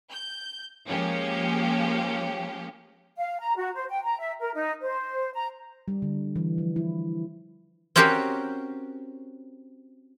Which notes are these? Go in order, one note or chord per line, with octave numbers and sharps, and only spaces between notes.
G6
F3 G#3 A#3 C#4 G4
F5
A#5
F#4
C5
G5
A#5
E5
A#4
D#4
C5
A#5
G3
D3
E3
F3
E4
C4 C#4 F#4 G4 A#4 C5